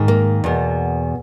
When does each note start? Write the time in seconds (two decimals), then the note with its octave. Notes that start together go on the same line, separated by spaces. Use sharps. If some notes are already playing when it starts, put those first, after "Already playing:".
Already playing: G#2 D#3
0.08 A#3
0.44 E2 B2